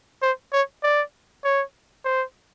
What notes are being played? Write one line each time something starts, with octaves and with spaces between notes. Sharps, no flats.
C5
C#5
D5
C#5
C5